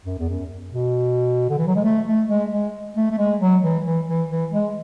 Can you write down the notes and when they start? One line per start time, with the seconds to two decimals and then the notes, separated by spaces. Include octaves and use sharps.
0.05 F#2
0.18 E2
0.29 F#2
0.72 B2
1.50 D3
1.58 E3
1.67 F#3
1.76 G#3
1.84 A3
2.07 A3
2.28 G#3
2.52 G#3
2.97 A3
3.11 A3
3.18 G#3
3.40 F#3
3.63 E3
3.85 E3
4.08 E3
4.29 E3
4.53 G#3